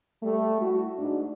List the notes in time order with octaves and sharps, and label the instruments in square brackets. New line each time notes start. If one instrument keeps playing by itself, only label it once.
[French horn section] G3 A3
E4 F#4
G#2 D4